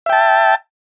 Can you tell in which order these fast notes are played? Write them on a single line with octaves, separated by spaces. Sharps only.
E5 G5 A5